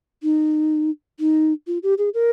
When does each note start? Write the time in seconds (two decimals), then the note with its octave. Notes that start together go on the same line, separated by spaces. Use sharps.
0.23 D#4
1.19 D#4
1.67 F4
1.83 G4
1.98 G#4
2.14 A#4